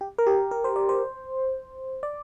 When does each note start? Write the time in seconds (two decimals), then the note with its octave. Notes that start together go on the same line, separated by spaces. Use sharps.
0.01 G4
0.18 A#4
0.27 G4
0.51 A#4
0.64 C5
0.76 D5
0.89 C5
2.03 D5